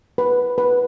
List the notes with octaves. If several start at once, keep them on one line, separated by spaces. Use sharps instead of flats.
B4
B4